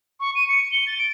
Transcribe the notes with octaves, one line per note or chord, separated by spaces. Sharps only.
C#6
D#7
C#7
G7
A6
D7